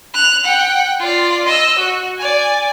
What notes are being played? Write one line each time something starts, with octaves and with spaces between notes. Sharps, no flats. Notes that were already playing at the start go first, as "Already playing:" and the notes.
F#6 F7
F#5 G5
F4 D5
D#5 E6
F#4
D5 G#5